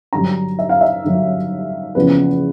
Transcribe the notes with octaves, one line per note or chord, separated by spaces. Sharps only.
G2 D3 F#3 A#5
E5
F5
E5
G2 D3 F#3
E2 C#3 F3 A#3 B4